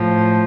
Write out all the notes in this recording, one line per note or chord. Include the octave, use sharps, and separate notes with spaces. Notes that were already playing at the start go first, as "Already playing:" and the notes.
Already playing: A2 F3